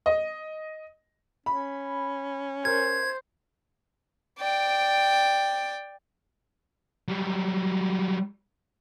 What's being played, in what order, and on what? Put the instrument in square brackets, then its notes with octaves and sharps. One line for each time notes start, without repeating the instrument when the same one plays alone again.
[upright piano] D#5
[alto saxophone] C#4 [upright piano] B5
[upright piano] A#4 [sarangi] C5 [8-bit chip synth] G#6
[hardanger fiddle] D5 G5
[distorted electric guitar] F#3 G3